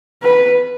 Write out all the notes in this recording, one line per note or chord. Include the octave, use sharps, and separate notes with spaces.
B4